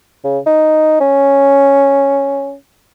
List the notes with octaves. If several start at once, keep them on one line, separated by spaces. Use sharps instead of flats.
C#3
D#4
C#4